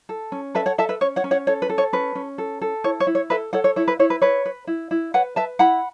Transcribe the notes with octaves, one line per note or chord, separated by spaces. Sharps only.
A4
C#4
A4 B4 E5
C#5 F#5
A4 E5 A5
B4 E5
C#4 C#5
C#5 F#5
C#4
C#5 F#5
A4 C#5
B4
A4
C#5
C#4 B4
C#4
A4
A4
E4 C#5
C#5
E4
C#5
A4 B4 E5
A4 C#5 F#5
C#5
E4 C#5
B4
E4 C#5
B4
B4 C#5
B4
E4
E4
B4 C#5 F#5
B4 E5 A5
E4 F#5 B5